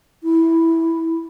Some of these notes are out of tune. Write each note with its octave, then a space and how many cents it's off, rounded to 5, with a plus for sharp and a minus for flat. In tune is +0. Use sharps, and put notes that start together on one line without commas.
E4 -5